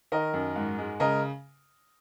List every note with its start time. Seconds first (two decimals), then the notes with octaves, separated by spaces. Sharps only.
0.12 D#3 A#4 D#5
0.34 F#2
0.56 G#2
0.78 G#3
1.00 C#3 A#4 D#5